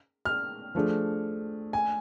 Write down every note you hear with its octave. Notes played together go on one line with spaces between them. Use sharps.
F6
F3 A3 D4 G#4
G#5